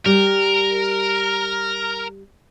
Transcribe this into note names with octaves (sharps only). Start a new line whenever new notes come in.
G3 A#4